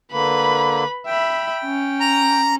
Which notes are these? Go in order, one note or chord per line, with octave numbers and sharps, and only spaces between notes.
D3 A#3 B4 B5
E5 G5 B5
C#4
A#5